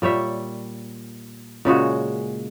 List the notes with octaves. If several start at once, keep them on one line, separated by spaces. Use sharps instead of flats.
A#2 G3 C#5 E5
A#2 C#3 G#3 F#4